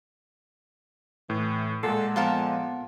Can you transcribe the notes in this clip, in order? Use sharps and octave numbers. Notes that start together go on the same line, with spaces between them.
A2 E3
A#2 G#3 A4 F#5 C6 C7
F3 B3 F4 A4 A#4 F#5 C6